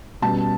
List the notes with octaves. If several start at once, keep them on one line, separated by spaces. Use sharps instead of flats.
B2 G3 C#4 A5